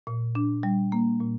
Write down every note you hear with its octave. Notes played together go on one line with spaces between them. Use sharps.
A#2
D4
G3
A#3
A#2